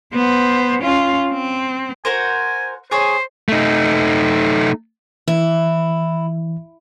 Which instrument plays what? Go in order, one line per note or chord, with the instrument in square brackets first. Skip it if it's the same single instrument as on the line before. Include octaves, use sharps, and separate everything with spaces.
[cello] B3 C5
C#4 F4
C4
[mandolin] F#4 A#4 C5 [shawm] G#5
[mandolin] G#4 C#5 [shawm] C5
[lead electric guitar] A3 D#4
[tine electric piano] E3 [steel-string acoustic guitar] E4